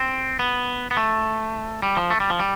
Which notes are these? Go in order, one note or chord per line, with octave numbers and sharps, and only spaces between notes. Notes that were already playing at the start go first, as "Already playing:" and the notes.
Already playing: C4
B3
B3
A3
G3
F3
A3
G3
F3
G3